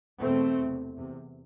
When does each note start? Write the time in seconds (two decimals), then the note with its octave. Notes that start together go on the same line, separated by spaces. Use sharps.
0.20 E2 B2 A3 C4
0.58 E2 C3
0.97 E2 C3